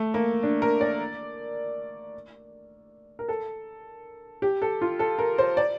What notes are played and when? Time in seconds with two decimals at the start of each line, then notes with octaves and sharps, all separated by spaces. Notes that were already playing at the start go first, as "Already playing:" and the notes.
Already playing: A3
0.14 A#3
0.43 D4
0.62 A#4
0.81 D5
3.19 A#4
3.28 A4
4.42 G4
4.62 A4
4.81 F4
4.99 A4
5.19 A#4
5.38 C5
5.57 D5